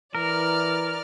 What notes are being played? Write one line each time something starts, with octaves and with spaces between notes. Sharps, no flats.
E3 A#4 D5 F6